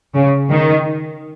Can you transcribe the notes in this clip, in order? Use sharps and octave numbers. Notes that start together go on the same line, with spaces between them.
C#3
D#3